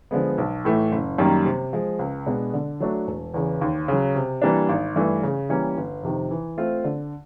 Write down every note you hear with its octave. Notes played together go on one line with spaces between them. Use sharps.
D3 F3 G#3 B3
B1
A2 E3 A3
F#1
F#2 D#3 G3 A#3
C3
F3 G#3
C#2
B2 G#3 B3 D4
D3
F#3 A3 D4 F#4
E1
E2 C#3 E3
D#2
C#3 F#3
C3
E3 G3 A#3 D4
G#1
G2 E3 A3
C#3
E3 G3 A#3 C#4
G1
F2 C3 D#3
E3
A3 C4 F4
D3